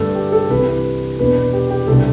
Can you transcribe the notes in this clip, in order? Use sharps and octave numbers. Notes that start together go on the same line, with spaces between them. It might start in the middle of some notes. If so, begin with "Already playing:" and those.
Already playing: G2 D3 A3 D4 A4
G4
A4
C2 C3 E3 B4
E2 B2 B3 D4 B4
G4
G4
C2 B2 G3 D4 A4